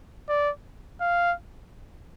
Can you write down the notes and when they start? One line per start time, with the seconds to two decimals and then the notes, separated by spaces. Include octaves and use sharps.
0.29 D5
1.01 F5